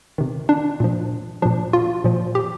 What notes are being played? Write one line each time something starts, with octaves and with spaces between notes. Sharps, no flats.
C3 D#3
D4
A#2 F3
A#2 F3 D4
F4
A#2 F3
G4